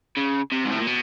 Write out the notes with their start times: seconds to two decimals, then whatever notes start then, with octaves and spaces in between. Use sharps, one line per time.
0.17 C#3
0.52 C3
0.65 G#2
0.71 A2
0.79 A#2
0.87 B2